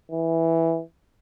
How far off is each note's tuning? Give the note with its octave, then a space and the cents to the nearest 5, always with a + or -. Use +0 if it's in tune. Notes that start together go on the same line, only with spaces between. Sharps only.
E3 -5